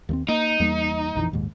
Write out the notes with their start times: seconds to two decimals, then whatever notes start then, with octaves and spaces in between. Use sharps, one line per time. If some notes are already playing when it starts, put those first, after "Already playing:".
0.09 D#2 A3 C4
0.28 A#3 D#4
0.60 E2 G3 A#3
1.15 A#1 F2 E3
1.32 A#1 D#2 G#2